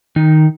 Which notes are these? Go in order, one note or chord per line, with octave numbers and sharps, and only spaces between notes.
D#3 D#4